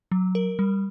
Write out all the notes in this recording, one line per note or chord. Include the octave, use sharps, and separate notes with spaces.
F#3
A#4
G3